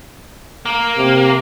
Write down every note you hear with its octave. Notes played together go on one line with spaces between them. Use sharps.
A#3
C3